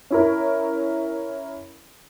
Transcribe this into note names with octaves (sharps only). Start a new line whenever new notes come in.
C#4 E4 A#4